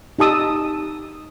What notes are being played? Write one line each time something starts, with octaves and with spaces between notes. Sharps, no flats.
D#4 G4 A5 D#6 E6